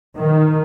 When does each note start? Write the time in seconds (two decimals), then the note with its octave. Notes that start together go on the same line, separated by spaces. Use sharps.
0.18 D#3